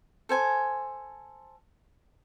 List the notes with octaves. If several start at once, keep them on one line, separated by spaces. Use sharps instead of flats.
A4 C5 G#5